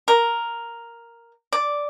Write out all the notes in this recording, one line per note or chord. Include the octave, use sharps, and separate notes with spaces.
A#4
D5